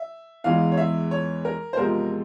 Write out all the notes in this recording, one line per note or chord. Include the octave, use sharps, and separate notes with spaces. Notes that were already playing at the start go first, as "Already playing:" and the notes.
Already playing: E5
E2 E3 G#3 F5
C#5
E5
C#5
A#4
C5
E2 C3 F3 G#3 A#4